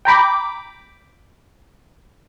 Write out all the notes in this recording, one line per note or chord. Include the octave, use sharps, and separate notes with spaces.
G5 A#5 B5 D6